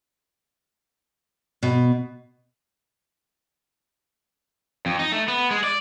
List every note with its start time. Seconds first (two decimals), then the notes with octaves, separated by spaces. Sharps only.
1.63 B2
4.86 F2
4.99 D#4
5.12 A3
5.28 B3
5.51 G#3
5.64 D5